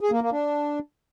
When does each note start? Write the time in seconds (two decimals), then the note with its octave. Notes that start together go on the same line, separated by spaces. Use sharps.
0.01 G#4
0.11 A#3
0.21 A#3
0.32 D4